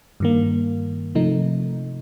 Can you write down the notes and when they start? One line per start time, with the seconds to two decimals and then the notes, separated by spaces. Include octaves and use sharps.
0.20 G2 D#3 A#3
1.15 C3 F3 A3 D#4